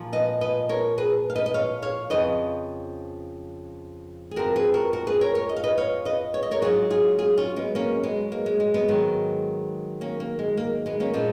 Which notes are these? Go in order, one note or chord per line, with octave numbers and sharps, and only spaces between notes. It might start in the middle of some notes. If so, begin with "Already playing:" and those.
Already playing: A#2 F3
B4 D#5
B4 D#5
A#4 C#5
G#4 B4
F5
B4 D#5
D#5
C#5 F5
C#5 F5
F2 C#3 F3 B4 D#5
G#4
F2 F3 F#4 A#4
G#4 B4
F#4 A#4
F#4 A#4
G#4 B4
A#4 C#5
A#4 C#5
D#5
F5
B4 D#5
C#5 F5
B4 D#5
C#5
D#5
A#4 C#5
G#2 F#3 F4 G#4
F4 G#4
F4 G#4
C#4 F4
G#3 B3
A#3 C#4
G#3 B3
A#3
G#3
G#3
G#3 B3
G#2 D#3 F#3
A#3 C#4
A#3
G#3
A#3
G#3 B3
A#3 C#4
A#2 F3 G#3 B3